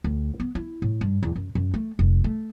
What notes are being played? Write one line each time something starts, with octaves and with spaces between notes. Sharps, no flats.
D2
B3
E4
A2
G2
E2
F#2
F#2
A3
F1
A3